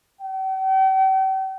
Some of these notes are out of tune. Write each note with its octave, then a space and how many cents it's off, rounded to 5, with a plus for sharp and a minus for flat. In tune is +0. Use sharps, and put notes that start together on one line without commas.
G5 -45